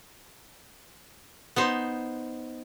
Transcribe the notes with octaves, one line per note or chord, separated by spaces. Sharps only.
B3 D#4 C5